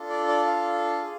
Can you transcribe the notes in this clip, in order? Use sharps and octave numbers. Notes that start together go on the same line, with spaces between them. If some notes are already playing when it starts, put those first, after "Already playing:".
Already playing: D4 F4 A4
D5
D5
F5
G#4